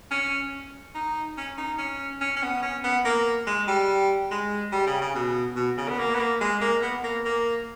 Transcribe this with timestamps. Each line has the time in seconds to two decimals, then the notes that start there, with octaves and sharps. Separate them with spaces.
0.11 C#4
0.94 D#4
1.37 C#4
1.57 D#4
1.78 C#4
2.21 C#4
2.36 C#4
2.42 B3
2.62 C#4
2.84 B3
3.04 A#3
3.47 G#3
3.68 G3
4.31 G#3
4.72 G3
4.87 C#3
5.01 C#3
5.15 B2
5.56 B2
5.77 C#3
5.88 B3
5.98 A#3
6.14 B3
6.19 A#3
6.41 G#3
6.61 A#3
6.82 B3
7.03 A#3
7.25 A#3